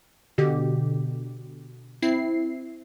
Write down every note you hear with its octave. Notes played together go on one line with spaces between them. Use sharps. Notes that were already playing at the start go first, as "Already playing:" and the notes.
B2 D3 G4
C4 E4 C7